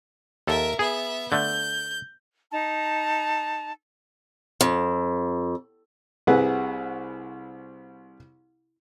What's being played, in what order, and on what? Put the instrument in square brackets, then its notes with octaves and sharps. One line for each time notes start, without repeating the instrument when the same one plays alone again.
[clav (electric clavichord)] D#2 A4 [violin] A#4 E5
[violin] B3 E5 [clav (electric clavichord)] G#4
[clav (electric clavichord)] D3 A3 [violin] G6
[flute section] D#4 A5 A#5
[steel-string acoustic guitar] F2
[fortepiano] C2 C3 G#4 B4 F#5